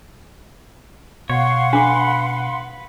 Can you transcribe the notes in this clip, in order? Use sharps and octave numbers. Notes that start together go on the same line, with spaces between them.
B2 C#5 F5 F#5 C6
D4 B4 D6